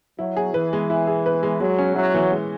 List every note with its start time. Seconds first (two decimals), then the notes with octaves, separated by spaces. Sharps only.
0.19 F#3 E4
0.37 G#4
0.54 E3 B4
0.73 G#3
0.90 E4
1.07 G#4
1.26 B4
1.43 G#3
1.60 F#3 G#3
1.79 C#4
1.96 F#3 E4
2.14 E3
2.31 G#3